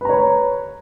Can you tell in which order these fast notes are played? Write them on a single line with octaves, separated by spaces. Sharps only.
B4 A#5 C#5